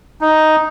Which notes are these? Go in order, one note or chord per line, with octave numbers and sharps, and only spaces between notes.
D#4